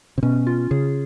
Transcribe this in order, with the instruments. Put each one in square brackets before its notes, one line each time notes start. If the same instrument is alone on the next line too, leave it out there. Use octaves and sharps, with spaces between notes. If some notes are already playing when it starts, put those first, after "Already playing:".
[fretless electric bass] C3
[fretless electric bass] B2 [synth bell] C#4
[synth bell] F4
[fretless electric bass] C#3 [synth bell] G#4